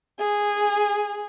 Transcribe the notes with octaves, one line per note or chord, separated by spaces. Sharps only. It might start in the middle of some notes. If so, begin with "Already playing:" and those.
G#4